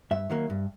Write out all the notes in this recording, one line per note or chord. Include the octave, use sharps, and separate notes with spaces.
G2 E5
D#3 F#3 A#3
G2